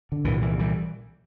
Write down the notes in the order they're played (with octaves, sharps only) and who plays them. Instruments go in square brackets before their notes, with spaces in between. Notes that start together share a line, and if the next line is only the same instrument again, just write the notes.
[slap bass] D3
C2 A#2 E3
E3
E3 G3